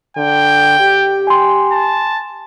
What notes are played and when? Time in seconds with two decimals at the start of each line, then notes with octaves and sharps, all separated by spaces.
0.17 D3 G5
0.81 G4
1.27 G#5 C6
1.72 A5